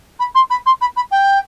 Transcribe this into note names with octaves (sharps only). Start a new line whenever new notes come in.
B5
C6
B5
C6
B5
B5
G5